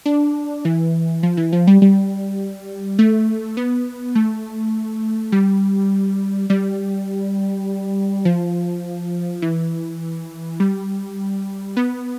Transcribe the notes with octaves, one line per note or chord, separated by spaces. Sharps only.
D4
E3
F3
E3
F3
G3
G3
A3
B3
A3
G3
G3
F3
E3
G3
B3